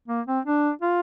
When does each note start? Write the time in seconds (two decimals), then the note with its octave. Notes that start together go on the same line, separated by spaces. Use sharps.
0.08 A#3
0.27 C4
0.45 D4
0.82 F4